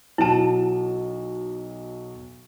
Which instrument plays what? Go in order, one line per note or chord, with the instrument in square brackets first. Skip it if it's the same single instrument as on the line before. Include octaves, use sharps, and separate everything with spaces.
[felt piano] B1 F#3 E7 [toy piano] E4 A5